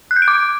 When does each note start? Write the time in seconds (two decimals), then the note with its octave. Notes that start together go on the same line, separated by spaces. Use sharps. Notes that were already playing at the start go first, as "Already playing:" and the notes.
0.11 F#6
0.16 G6
0.22 D7
0.28 D6